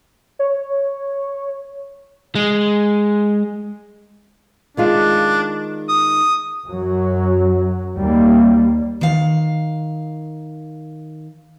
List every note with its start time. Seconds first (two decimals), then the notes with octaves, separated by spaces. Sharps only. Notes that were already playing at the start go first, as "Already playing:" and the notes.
0.39 C#5
2.35 G#3
4.77 D#3 G#3 D4 F4
5.89 D#6
6.67 F#2 F#3
7.97 D#2 G3 A#3
9.01 D#3 F5